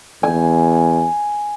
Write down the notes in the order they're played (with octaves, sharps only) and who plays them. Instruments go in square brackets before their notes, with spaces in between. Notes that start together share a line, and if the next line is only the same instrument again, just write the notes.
[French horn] E2 [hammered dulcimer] G#5